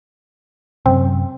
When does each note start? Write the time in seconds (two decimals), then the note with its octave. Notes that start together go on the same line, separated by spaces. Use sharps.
0.86 F#2 C3 C4